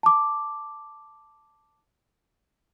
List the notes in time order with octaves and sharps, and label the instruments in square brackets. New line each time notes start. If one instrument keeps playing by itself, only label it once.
[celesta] A5 D6